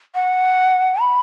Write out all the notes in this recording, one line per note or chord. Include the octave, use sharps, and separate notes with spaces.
F#5
B5